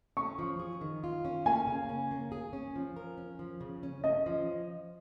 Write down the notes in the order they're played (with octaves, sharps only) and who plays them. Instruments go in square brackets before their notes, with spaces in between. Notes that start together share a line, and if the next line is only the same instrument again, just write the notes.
[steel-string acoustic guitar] C#4 [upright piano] C#6
[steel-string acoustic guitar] F3
G#4
D#3
F4
C#4
[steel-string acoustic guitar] A#3 [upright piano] G#5
[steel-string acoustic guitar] C#3
C#4
A#3
G#4
C#4
F3
A#4
C#4
F3
C#3
C#4
[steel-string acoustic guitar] C#4 [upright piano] D#5
[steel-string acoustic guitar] F3